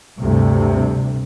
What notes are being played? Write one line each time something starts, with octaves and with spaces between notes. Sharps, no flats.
D2 G2 C3